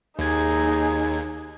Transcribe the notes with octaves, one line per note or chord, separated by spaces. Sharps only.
D#2 D#4 G#4 G#6